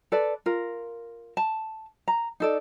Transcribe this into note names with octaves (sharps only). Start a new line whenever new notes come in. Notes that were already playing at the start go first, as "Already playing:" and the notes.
A4 B4 D5
F4 A#4
A5
A#5
D#4 A4 D5